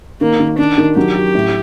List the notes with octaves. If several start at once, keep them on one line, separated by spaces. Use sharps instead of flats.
D#3 A#3
D#3
D#3 D4
D#3
F#3 G4
F#4
A2